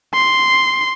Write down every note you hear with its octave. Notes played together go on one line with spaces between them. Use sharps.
C6